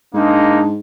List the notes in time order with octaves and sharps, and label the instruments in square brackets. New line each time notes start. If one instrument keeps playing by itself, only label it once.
[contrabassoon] G#2 [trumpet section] G#3 A#3 D#4 [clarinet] D4